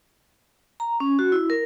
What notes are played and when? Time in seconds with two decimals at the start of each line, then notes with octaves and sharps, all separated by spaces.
0.80 A#5
1.00 C#4
1.19 F#4
1.32 E4
1.50 A#4